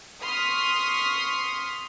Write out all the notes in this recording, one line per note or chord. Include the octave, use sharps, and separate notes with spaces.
C6 C#6 D#6 F6 B6 C7